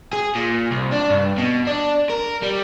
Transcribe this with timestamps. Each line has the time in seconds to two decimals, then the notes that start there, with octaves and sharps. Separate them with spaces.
0.13 G#4
0.35 A#2
0.71 C2
0.92 D4
1.10 G2
1.38 B2
1.67 D4
2.09 A#4
2.42 G3